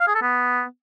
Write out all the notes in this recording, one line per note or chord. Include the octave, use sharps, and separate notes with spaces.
F5
G#4
A4
B3